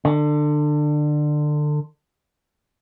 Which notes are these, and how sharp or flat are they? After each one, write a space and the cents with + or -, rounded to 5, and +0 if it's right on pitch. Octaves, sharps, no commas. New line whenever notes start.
D3 +25